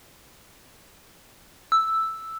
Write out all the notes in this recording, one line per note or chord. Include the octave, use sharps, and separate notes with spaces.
E6